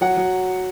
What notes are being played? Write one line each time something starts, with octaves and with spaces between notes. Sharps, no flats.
F#3 F#5
F#3